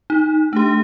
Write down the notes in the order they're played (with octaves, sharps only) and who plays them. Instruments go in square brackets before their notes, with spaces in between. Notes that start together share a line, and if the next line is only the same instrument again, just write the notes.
[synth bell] D#4
[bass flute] A3 [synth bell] D4 G4